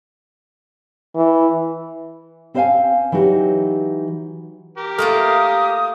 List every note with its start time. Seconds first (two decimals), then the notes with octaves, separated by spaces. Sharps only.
1.15 E3
2.54 C4 B4 C5 E5 F5 G#5
3.12 E3 F#3 D#4 F#4 G4
4.78 G4 A#4
4.98 A3 A#3 F4 A4 D#6